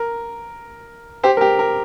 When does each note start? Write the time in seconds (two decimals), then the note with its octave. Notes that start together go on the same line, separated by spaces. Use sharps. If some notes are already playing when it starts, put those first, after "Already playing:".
Already playing: A#4
1.23 G4 C5
1.37 A#4
1.41 G4
1.59 A#4